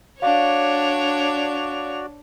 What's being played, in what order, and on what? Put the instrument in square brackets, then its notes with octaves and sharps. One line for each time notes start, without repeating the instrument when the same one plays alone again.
[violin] D4 F7 [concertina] F#4 D5 [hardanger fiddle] C#5 [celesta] F5